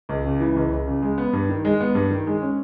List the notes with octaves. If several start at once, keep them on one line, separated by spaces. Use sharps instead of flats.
C#2
C#3
E3
C#2
C#2
C#3
G#3
B3
G2
D#3
G#3
B3
G2
D#3
G#3
C#4